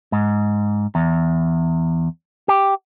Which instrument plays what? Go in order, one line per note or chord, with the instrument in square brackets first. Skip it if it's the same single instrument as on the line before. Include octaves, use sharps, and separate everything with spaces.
[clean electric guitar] G#2
E2
G4